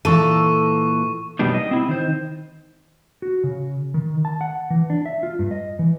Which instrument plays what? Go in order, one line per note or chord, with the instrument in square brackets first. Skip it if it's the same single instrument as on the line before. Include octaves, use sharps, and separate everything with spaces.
[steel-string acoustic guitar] A#2 E3 [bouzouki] A4 [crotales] C#6 D#7
[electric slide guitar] F#2 B2 G3 B3 D4 D#4
D#5
C4 E4
D#3 C5
F#4
C#3
D#3
A5
F#5
E3
D4
E5
F4
G2
D#5
E3